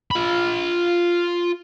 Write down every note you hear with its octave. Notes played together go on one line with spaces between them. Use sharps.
F4 B5